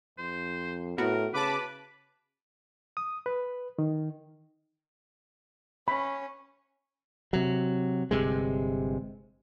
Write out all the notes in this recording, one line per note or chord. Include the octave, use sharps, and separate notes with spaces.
F2 C5
A2 B3 F#4 A#4
C#3 B4 A5 B5 D6
D#6
B4
D#3
C#4 B5
C3 F#3
G1 G2 C3 G#3